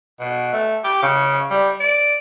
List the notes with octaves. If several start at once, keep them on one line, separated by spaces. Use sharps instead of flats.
B2
A3
G4
C#3
G3
D5